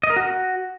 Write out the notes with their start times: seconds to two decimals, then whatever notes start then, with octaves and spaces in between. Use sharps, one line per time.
0.03 D#5
0.10 A#4
0.16 F#4